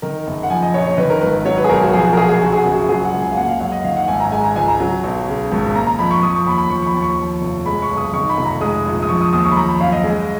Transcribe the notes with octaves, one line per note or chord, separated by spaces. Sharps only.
D#3 A#4
F#1
F#5
F3 G#5
D#5
A#1 C#5
C#5
D#3 B4
A#4
G#1 B4
F#3 C#5
B4
G#4
B1 A#4
F#4
F3 G#4
F#4
A#4
A#1 G#4
G#4
C#3 F#4
G#4
F#4
F#1
F#4
F#3 G#4
F#5
C#2
G#5
F5
A#3 F#5
F5
F#2 F#5
D#5
D#3 F5
F#5
G#1 G#5
A#5
G#3 G#5
A#5
C#2 G#5
A#5
F#3
B1
C#3
G#1
A#3 A#5
A#5
F2 B5
C#6
F3 D#6
C#6
D#2 B5
B5
F3 C#6
C#6
B5
D#2
C#6
F3
F1
G#3 B5
C#6
B1
D#6
D#3 C#6
B5
F1
A#5
G#3 D#6
A#1
D#6
F3 C#6
D#6
D#2 D#6
C#6
B5
F3 A#5
B5
F#2 F5
D#5
G#3